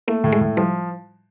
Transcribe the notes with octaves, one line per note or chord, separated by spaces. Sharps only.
A3 A#3
A2
G#3
A2
F3 G3